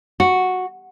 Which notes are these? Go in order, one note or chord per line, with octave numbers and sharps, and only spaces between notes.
F#4